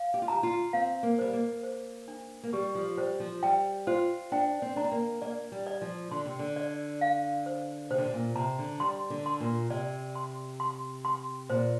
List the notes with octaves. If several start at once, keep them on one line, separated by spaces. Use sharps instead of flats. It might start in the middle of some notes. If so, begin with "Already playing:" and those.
Already playing: F5
G4
F4
G4 A#5
F4
C4 F5
A#3
G3 C5
A#3
C5
D4
A#3
G3 G4
F3
G3 C5
F3
G3 G5
F4 C5
D4 G5
C4
D4 A#5
C4
A#3
A#3 D5
G3
D5
F3
D3 C6
C3
D3
D5
F5
C5
C3 C5
D3
C3
A#2
C3 A#5
D3
G3 C6
D3
C6
A#2
C3 D5
C6
C6
C6
A#2 C5